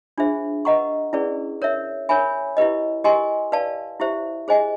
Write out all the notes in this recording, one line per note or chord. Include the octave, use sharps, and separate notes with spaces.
D4 F4 G#4 C5 E5
B4 D#5 F#5 A#5 C#6
C#4 E4 G#4 B4 D5
A#4 C#5 E5
A#4 C#5 E5 G#5 B5
E4 G4 B4 D#5
G4 A#4 D#5 G#5 C6
B4 D5 F5 A5
E4 G4 C5 E5
G#4 C5 D#5 G#5